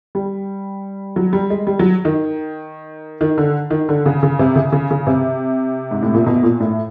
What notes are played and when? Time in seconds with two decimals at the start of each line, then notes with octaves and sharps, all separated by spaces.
0.15 G3
1.16 F#3
1.33 G3
1.50 G#3
1.67 G3
1.79 F#3
2.05 D#3
3.21 D#3
3.38 D3
3.70 D#3
3.89 D3
4.06 C#3
4.23 C#3
4.39 C3
4.56 C#3
4.72 C#3
4.91 C#3
5.07 C3
5.91 G#2
6.03 A2
6.14 A#2
6.26 B2
6.43 A#2
6.60 A2